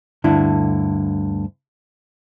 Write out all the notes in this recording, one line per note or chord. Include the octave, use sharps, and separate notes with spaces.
D2 G2 D3 E4